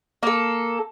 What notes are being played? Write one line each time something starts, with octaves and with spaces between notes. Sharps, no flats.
A#3 A4